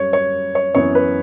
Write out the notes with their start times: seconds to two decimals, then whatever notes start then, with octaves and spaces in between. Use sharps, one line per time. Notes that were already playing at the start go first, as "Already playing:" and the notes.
Already playing: F#2 G3 C#5
0.13 C#5
0.55 C#5
0.75 F#2 E3 B3 C#5
0.95 B4